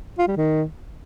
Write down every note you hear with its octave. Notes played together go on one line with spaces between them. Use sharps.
F4
G3
D#3